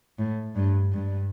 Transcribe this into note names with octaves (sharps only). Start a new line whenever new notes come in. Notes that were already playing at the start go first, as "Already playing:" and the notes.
A2
G2
G2